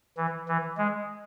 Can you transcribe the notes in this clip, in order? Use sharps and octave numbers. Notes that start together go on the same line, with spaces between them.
E3
E3
G#3